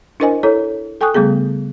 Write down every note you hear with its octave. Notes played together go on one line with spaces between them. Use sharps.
D4 E4 A#4 C5 D#5 G#5
E4 A4 C#5 A#5
A4 G5 G#5 C#6 D#6 F#6
C#3 G3 A3 B3 G#4